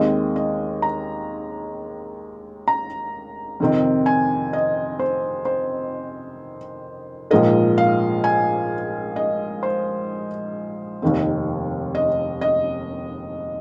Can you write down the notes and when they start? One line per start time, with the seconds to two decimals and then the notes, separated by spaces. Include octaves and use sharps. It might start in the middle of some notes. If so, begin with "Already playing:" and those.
Already playing: D#2 D#3 G#3 C4 D#5
0.36 D#5
0.82 A#5
2.68 A#5
3.60 F2 C3 D#3 C4
4.06 G#5
4.53 D#5
4.99 C5
5.45 C5
7.31 A#1 G#2 F3 A#3 D#5
7.78 F5
8.24 G#5
9.16 D#5
9.63 C5
11.02 F1 D#2 D#3 C4
11.95 D#5
12.41 D#5